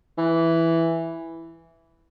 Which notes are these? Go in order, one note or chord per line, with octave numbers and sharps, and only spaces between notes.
E3